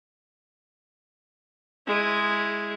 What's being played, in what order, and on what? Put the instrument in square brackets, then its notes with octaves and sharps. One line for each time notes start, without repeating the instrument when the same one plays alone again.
[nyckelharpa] G#3 E4